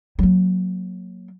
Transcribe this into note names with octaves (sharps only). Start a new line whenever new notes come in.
F#3 A#3